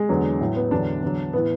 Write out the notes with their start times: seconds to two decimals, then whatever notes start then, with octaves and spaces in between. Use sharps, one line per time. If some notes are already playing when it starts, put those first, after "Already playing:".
Already playing: G#3
0.09 E2 D3 F#3
0.41 A2 F#3
0.56 B3
0.71 E2 D3 F#3 D4
1.03 E2 D3 F#3
1.33 A2 E3 B3